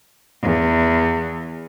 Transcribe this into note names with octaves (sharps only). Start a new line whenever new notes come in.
E2